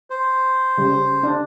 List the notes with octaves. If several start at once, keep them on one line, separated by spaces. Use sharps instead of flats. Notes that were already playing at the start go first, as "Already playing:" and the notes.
C5
C#3 G3
D4